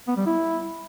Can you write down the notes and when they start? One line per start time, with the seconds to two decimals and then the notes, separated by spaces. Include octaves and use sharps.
0.08 B3
0.17 G3
0.26 E4